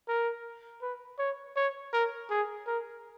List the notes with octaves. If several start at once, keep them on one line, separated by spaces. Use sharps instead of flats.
A#4
B4
C#5
C#5
A#4
G#4
A#4